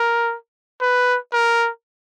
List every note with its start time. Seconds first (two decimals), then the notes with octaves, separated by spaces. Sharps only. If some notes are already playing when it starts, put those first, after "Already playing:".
Already playing: A#4
0.81 B4
1.33 A#4